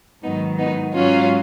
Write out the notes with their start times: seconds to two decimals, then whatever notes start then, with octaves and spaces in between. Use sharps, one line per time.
0.23 G#2 D#3 F#3 B3 D#4
0.58 B3 D#4
0.94 G#2 F#3 C#4 F4